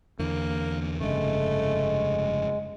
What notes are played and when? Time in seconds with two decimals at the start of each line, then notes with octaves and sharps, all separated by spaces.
0.19 E2 D3 A#3
1.01 F1 G2 C#3 G#3 A3